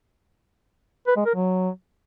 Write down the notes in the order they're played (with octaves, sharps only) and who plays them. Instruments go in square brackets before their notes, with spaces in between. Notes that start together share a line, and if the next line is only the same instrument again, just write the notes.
[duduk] B4
G#3
A#4
F#3